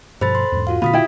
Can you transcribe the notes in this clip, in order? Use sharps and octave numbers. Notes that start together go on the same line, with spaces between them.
G2 B2 F3 A4 C5 B5 A6
C6
E2 G#2
F4 F#4 F5
A#2 D3 B3 F4 B5 D#6 B6
E4 G5